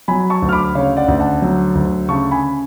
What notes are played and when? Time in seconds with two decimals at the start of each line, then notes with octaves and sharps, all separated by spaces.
0.08 F#3 G#5 B5
0.30 A5 C#6
0.42 D2
0.49 F6
0.53 B5 D6
0.75 C#3 C#5 F5
0.97 D5 F#5
1.08 D2
1.20 F#5 A5
1.42 F#3
1.75 D2
2.08 C#3 A5 C#6
2.31 G#5 B5